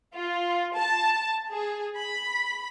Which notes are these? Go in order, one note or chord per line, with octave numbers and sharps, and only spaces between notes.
F4
A5
G#4
B5